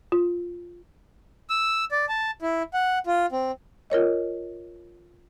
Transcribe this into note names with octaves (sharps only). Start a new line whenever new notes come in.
F4
E6
D5
A5
E4
F#5
F4
C4
F4 A#4 C#5 D#5